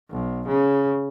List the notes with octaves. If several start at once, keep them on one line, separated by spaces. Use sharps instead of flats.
B1
C#3